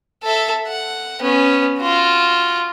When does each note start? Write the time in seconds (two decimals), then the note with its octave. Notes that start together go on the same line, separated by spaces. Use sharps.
0.23 A4 E5
0.68 F#5
1.20 B3 C#4
1.79 F4 F#4